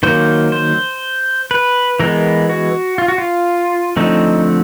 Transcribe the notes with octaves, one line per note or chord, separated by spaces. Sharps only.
D#3 F#3 A#3 C5
C5
B4
E3 G#3 B3 A#4
F#4
F4
F#4
F4
D3 F3 A3 C4 D#4